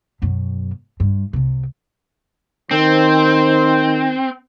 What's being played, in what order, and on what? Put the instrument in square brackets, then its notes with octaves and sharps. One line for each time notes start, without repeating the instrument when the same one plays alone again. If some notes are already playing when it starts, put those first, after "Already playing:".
[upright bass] F#2 B2
G2
C2 C3
[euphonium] D#3 [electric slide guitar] C4 [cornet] C5